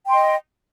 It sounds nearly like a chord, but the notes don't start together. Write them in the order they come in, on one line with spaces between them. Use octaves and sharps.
G5 C6 D#5